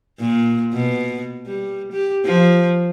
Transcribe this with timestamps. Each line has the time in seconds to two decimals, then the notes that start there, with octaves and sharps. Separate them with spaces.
0.19 A#2
0.74 B2
1.47 G3
1.93 G4
2.25 F3